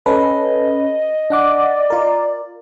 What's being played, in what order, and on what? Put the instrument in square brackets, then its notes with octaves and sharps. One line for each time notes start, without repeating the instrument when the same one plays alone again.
[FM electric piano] C#4 A4 B4 [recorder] D#5
[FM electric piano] D4 F#5 D6 [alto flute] D5
[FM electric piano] F4 A#4